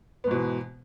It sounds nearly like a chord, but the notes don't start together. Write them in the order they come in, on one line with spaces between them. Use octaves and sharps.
B3 G#2 B2 E3